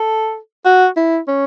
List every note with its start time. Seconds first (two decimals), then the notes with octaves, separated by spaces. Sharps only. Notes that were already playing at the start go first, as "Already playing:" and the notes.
Already playing: A4
0.65 F#4
0.96 E4
1.27 C#4